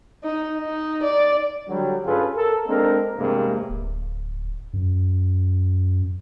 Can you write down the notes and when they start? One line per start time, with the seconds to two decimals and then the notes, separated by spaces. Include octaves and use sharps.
0.23 D#4
0.57 D#4
1.03 D5
1.68 D3 F#3 G3
2.06 G2 C#4 F4 G#4 A4 B4
2.36 A4 A#4
2.66 G#3 A#3 C4 D4 A4 A#4
3.18 E2 G2 C3 G#3 A#3
3.70 D1
4.73 F#2